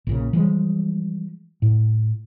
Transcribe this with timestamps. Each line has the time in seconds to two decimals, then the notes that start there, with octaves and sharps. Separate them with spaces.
0.07 A#1 A#2 C#3
0.33 E3 F3 G3 G#3
1.62 A2